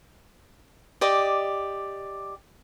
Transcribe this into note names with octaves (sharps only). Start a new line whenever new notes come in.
G4 D5 D#5 D6